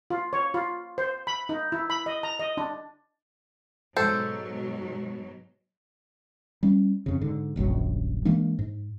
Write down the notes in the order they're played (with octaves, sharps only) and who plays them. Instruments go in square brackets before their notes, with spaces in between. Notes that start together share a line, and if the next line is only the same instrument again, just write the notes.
[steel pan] F4
C#5
F4
C5
B5
D#4
E4
B5
D#5
A#5
D#5
D4
[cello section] G#2 B2 F#3 [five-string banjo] A4 C5
[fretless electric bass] G3 C#4
F2 C#3
G#2 D3
D#1 A#1 F#2 F#3
E3 G#3 A#3 D4
G#2